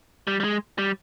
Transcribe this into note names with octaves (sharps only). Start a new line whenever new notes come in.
G3
G3
G#3
G3